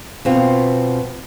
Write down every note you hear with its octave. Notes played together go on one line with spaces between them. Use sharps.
B2 C4 F4